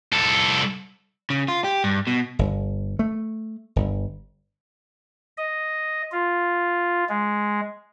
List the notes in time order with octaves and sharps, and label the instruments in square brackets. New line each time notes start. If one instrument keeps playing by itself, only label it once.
[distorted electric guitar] C2 A4
[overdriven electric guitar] C#3
F4
G4
G2
B2
[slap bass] G1
A3
G1
[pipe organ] D#5
F4
G#3